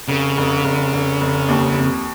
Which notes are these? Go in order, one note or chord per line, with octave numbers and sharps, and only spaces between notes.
F1 C#3
F1
F1
F1
F1
D#2
F2